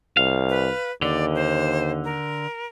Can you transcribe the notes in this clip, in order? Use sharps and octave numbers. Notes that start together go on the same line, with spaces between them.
C2 F5
B4
D#2 D3 D5
C5
A#4